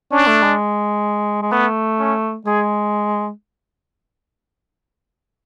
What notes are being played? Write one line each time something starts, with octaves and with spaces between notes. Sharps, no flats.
C#4 D4
A3
G#3
G#3
A3 B3
C#4
G#3 G#4